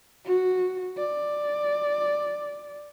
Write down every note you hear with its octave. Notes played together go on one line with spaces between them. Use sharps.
F#4
D5